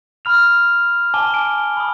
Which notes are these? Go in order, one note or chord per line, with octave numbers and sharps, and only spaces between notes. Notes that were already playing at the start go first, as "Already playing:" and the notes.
B5 F6 F7
G#5 A5 D6 G7
D7
B5 D#6